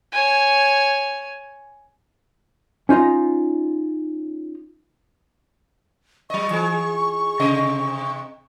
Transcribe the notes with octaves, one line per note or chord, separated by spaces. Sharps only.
C#5 G#5
C#4 D#4 F4 D#5
F#3 D#5 C#6
E3 G#4
C3 D#5